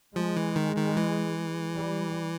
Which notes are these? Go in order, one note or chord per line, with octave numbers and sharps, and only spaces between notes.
F3 G#3
E3
D#3
D#3
E3
G3